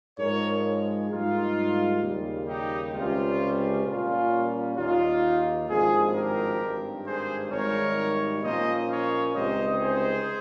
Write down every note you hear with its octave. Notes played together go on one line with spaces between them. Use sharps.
G#2 F3 G#3 A#4 C#5
G#2 G3 A#3 D#4 F4
D#2 C#3 G3
D#4 G4
C#2 C3 G3 C#4 F4
A#2 G3 A#3 C#4 F4
D#2 D#3 A#3 D#4 F4
G#1 G2 F3 F4 G#4
G4 A#4
G#1 G2 G3
G#4 C5
G#1 G#2 D#3 G3 A#4 C#5
A#2 F3 A#3 C#4 C5 D#5
C#5 F5
C#2 C3 G3 C4 D#4 C5 D#5
G#4 C5